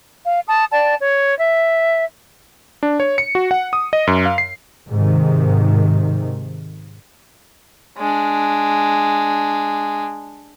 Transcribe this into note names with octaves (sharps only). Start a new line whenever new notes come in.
F5
A5 D#6
D5 G5 A5
C#5
E5
D4
C#5
C#7
F#4
F#5
D#6
D#5
F#2
F5
C7
G#2 C3 D#3
G#3 D4